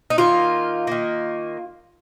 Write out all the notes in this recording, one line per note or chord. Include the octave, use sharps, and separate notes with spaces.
D#4
D#3 A#3 F4
D#3 A#3